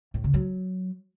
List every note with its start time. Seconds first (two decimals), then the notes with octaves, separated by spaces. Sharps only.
0.14 A2
0.24 C#3
0.34 F#3